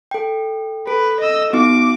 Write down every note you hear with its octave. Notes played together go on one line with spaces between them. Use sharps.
A4 G5
A4 B4
D#5 E6
B3 D#4 F#4 D6